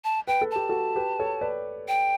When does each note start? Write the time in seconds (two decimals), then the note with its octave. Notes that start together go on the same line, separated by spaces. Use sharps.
0.04 A5
0.27 B4 G5
0.41 A4
0.51 G4 A5
0.69 F#4 A4
0.96 G4 B4
1.19 A4 C#5
1.41 B4 D5
1.88 G5